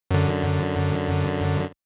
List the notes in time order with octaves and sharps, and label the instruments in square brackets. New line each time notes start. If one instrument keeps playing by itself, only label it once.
[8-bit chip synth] F#2 D3